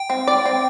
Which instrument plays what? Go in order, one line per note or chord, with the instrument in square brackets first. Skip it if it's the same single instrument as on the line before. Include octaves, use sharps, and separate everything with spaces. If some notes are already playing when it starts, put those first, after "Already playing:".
Already playing: [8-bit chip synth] G5
[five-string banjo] C4
D5
C4